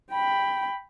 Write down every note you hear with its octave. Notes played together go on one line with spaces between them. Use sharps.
G5 B5